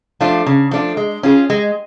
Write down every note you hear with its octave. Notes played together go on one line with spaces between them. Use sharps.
F3 A3 D4 F4
C#3
F3 A3 D4 F4
G#3
C#4 F4 G#4
G#3